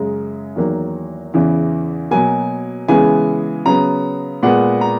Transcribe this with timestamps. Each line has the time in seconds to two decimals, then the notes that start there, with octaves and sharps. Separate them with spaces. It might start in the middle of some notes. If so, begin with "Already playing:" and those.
Already playing: F#2 C#3 G#3 A#5
0.56 E2 D#3 F#3 A#3
1.34 E2 C#3 E3
2.11 B2 F#3 A#3 G#5
2.88 C#3 E3 G#3 B3 G#5
3.66 C#3 F#3 B3 A#5
4.43 A#2 G#3 B3 F#5
4.81 A#5